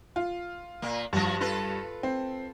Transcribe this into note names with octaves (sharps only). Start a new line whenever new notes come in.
F4
A#2 A#3
G2 F3 F#4 A#6
F4 A4 B4
C4